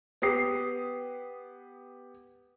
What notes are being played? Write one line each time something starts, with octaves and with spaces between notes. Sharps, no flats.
B3 G4 D#6 C7